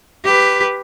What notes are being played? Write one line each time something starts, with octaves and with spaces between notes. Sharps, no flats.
G4 B4